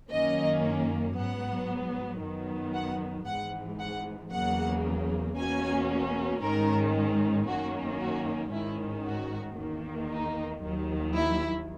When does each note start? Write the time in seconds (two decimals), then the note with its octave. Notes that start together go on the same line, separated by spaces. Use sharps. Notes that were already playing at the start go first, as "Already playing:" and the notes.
0.11 F#2 D#3 A#3 C#4 D#5
1.16 G#2 F#3 B3 F#5
2.22 F#2 D#3 F#3 B3
2.74 F#5
3.27 G#1 G#2 E3 F#5
3.79 F#5
4.32 E2 C#3 F#3 A#3 F#5
5.37 E2 B2 A#3 C#4 G#5
6.42 G#2 D#3 G#3 C#4 A#4
7.48 F#2 D#3 A#3 C#4 F#4
8.00 F#4
8.52 G#1 G#2 D#3 G#3 C#4 E4
9.05 F#4
9.57 E2 D#3 A#3
10.10 D#4
10.63 D#2 D#3 F#3
11.16 E4